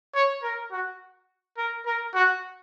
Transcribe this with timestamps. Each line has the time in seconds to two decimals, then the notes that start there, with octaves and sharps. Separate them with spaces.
0.15 C#5
0.43 A#4
0.72 F#4
1.58 A#4
1.86 A#4
2.14 F#4